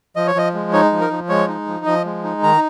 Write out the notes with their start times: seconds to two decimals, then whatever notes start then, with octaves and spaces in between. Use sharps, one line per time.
0.16 F3 D#5
0.27 C#5
0.35 F3 D#5
0.54 G#3
0.73 D#4 C#5
0.92 F3
1.01 A#4
1.11 F3
1.29 G#3 C#5
1.48 D#4
1.67 F3
1.86 F3 D#5
2.05 G#3
2.24 D#4
2.43 D#3 A#5